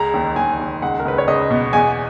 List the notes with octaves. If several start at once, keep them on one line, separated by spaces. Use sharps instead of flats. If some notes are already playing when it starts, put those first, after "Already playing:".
Already playing: C#2 C#3 A#5
D#2
D#2 G#5
D#2
C#2 F#5
A#4
C#2 B4
C#5
C#2 D#5
B2
E2 G#5